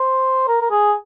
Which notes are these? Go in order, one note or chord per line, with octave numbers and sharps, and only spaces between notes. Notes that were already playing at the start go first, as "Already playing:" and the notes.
Already playing: C5
A#4
A#4
G#4